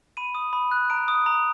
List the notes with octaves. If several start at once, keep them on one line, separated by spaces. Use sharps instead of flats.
B5 D#7
D#6
B5
F#6
A#5 D7
D#6
A#5